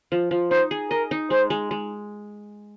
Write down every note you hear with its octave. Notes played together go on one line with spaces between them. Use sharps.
F3
F3
D#4 C5
G#4
A#4 D#5
D#4
G#3 C5
G#3
G#3